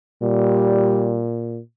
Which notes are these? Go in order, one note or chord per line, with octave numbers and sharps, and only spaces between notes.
A#2 G3